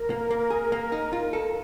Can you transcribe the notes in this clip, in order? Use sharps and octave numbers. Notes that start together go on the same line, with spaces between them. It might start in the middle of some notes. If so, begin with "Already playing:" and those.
Already playing: A#4
A#3
A#3
G#4
A#3
D#4
F4
A4